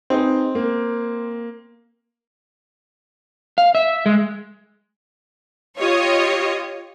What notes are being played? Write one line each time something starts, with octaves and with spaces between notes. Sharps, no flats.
C4 D#4 G#4 B4
A#3
F5
E5
G#3
F4 G4 C#5 D#5